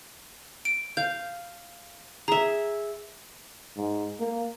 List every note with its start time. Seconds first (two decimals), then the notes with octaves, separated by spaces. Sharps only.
0.65 D7
0.97 F5 G6
2.28 G#4 E5 A#5
3.77 G#2
4.20 A#3